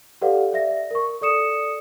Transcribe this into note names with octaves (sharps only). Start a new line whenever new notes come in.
G4 A4 B4 D5 F5 F#5
D5 E5 A#6
A#4 C#6
A4 D5 D#6 C#7 E7